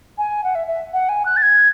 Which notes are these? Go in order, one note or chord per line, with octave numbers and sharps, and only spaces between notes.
G#5
F#5
E5
E5
F#5
G#5
F#6
A6
G#6